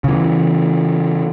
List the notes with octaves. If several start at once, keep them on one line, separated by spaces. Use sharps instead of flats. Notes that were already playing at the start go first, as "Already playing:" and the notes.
C#3 E3